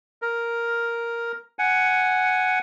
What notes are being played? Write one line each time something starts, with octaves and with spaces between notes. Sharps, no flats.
A#4
F#5 G#5